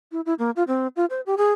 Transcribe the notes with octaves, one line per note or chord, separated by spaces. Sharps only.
E4
E4
A#3
F4
C4
F4
C5
G4
G#4